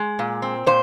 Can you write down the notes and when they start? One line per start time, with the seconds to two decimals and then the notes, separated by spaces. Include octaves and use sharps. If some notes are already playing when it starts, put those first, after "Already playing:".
Already playing: G#3
0.19 A#2
0.42 C4
0.66 A#2 C5